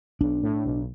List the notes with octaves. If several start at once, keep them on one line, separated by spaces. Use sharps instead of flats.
B1 D4
A2
B1